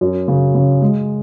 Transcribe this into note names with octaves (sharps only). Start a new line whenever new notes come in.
F#2
C#3
C#3
G#3